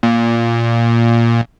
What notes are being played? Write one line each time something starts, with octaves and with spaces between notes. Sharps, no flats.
A#2